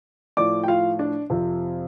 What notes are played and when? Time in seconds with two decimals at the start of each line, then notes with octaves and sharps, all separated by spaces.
0.37 A2 F3 D5 D6
0.64 G5
0.68 F4 F5
0.99 D4 D5
1.30 F2 C3 F3